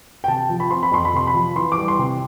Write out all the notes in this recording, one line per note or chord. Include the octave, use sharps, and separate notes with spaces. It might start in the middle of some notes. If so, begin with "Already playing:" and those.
G5
C3 A5
F3
B5
C4 C6
B5
F2 C6
B5
C3 C6
B5
F3
E3 C6
D6
G3
C6
C3